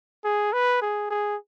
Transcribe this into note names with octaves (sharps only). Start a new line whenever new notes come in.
G#4
B4
G#4
G#4